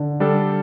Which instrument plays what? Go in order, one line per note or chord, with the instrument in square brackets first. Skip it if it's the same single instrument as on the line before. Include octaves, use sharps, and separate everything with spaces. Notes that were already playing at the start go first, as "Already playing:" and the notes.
Already playing: [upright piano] D3
[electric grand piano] G3 D4 A4